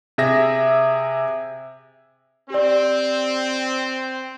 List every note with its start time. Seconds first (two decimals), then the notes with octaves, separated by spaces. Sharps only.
0.18 C3 G#4 E5 A#6
2.50 C4 G4 D5